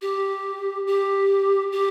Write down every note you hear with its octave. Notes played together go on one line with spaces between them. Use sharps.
G4
G4
G4